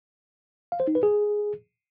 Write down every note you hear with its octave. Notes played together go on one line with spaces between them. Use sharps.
F5
C5
D#4
B4
G#4